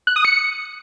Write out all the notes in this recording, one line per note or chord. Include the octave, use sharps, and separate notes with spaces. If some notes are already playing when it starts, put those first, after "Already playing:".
F#6
D#6
C#7